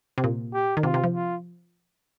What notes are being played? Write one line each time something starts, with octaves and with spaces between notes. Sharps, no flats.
C3
A#2
G4
D#3
C3 F4
C3
F3
F4